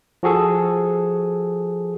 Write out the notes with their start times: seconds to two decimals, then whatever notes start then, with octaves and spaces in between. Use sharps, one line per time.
0.23 F3 F#4 G#4 A4